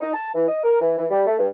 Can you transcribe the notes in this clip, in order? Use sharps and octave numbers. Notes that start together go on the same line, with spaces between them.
D#4
A5
E3
D#5
A#4
E3
E3
G3
A3
G2